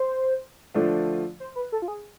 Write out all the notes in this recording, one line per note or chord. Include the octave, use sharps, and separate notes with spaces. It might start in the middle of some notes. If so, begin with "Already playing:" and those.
Already playing: C5
D3 F3 A3 D4 F4
C5
B4
A4
F4
G#4